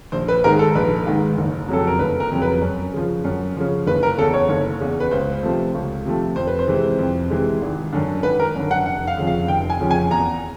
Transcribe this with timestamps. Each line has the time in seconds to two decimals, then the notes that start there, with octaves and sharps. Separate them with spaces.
0.12 A#1 C5
0.28 B4
0.44 G#2 D#3 G#3 A#4
0.59 A4
0.75 A#1 B4
1.06 G#2 D#3 G#3
1.37 F#1
1.68 F2 C#3 F#3 A4
1.87 A#4
1.99 F#1 B4
2.20 A#4
2.31 F2 C#3 F#3
2.42 B4
2.62 F#2
2.94 C#3 F3
3.24 F#2
3.56 C#3 F3
3.87 F#1 B4
4.03 A#4
4.18 E2 C#3 A4
4.33 C#5
4.49 F#1
4.81 E2 C#3
5.00 B4
5.11 C#2 C5
5.43 C3 F3 A3
5.75 C#2
6.05 C3 F3 A3
6.36 F2 C5
6.47 B4
6.59 C5
6.67 C3 E3 G#3
6.99 F2
7.30 C3 E3 G#3
7.61 G#1
7.92 F#2 D3
8.23 G#1 B4
8.40 A#4
8.55 F#2 D3
8.71 F#5
8.86 F1 F#5
9.07 F5
9.17 F2 C#3 F3
9.27 F5
9.48 F1 G5
9.70 G#5
9.80 F2 C#3 F3
9.91 G#5
10.10 E2 A#5